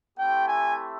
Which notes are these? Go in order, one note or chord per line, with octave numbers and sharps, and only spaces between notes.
A3 C4 E4 G4 G5
G#5